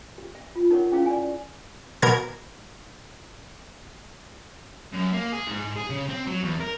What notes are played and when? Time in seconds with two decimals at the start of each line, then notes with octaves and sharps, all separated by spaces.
0.18 G4
0.35 E5
0.56 F4
0.71 D#4 A#4 C#5 F#5 C#6
0.92 C#4 E4 G#4 C5 F5 C#6
1.06 D5 G#5
2.02 B2 A#4 G#6
4.93 F#2
5.13 A#3
5.32 G#4
5.47 G#2
5.76 G#4
5.90 C#3
6.09 C4
6.27 F#3
6.43 E2
6.60 A#4